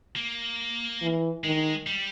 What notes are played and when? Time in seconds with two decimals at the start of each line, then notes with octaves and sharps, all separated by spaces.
0.16 A#3
1.02 E3
1.44 D#3 G#3
1.87 G3